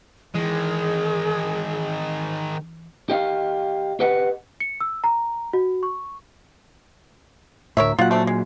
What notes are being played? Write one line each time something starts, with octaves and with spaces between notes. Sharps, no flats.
D#3 E3 G#3 G#4
G4 D#5 F5
G4 B4 D#5 F#5
C#7
E6
A#5
F#4
C#6
D2 A2 A#4 C#5 E5
A#2 F#3 F4 F#5
A3 C4 D4
G#3